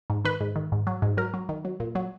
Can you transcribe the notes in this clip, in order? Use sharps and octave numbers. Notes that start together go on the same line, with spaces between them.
G#2
D#3 B4
G#2
D#3
G#2
F#3
G#2
F#3 A#4
F#3
D#3
F#3
A#2
F#3